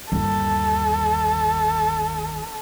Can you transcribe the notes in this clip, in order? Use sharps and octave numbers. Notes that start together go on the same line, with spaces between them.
G1 D#2 A4